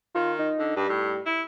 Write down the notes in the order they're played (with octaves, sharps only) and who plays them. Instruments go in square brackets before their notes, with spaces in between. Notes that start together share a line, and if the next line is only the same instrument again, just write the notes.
[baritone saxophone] D#3 [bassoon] F4
[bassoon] D#4
[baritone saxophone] D3
[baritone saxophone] G2 [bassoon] G3
[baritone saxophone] A2
E4